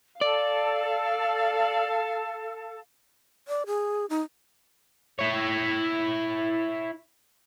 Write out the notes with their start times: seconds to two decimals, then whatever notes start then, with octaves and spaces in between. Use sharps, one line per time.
0.21 A4 D5 F5
3.48 D5
3.67 G#4
4.10 D#4
5.19 E4 C#5